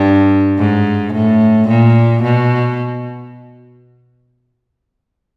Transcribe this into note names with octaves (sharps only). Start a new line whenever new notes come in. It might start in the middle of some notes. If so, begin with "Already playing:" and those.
Already playing: G2
G#2
A2
A#2
B2